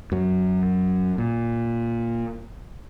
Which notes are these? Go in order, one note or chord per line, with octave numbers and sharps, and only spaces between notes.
F#2 F#3
A#2